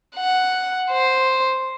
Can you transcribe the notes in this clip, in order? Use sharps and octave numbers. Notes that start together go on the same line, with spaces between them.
F#5
C5